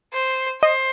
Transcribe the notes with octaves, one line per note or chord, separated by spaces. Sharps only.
C5
C5 D#5